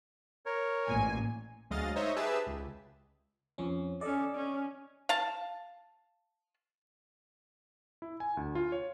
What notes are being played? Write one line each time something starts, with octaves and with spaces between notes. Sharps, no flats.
A#4 C#5
A1 A#2 G#5
D2 F#3 G#3 D#5 F5 A6
D#4 C5 C#5 D#5 E5
G4 G#4 B4 E5 A5 E6
C#2
F2 F3 C#4
C#4 A4 D5 D#5
C#4
F5 A5
E4
G#5
D2
F4
C#5